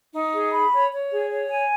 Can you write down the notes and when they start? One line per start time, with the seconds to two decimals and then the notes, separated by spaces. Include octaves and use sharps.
0.13 D#4
0.33 G#4
0.52 B5
0.72 C#5
0.91 C#5
1.11 G#4
1.30 C#5
1.50 G#5